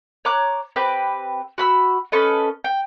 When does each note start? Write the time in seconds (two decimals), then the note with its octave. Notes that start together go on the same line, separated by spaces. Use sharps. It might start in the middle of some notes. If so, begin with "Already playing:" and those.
0.25 C#5 A#5 D6 F#6
0.76 C4 G4 B4 F#6
1.58 F#4 B5 E6
2.12 C#4 A4 B4 D#5
2.64 G5